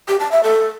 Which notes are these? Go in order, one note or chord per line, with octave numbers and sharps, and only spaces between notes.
G4
A5
E5
A4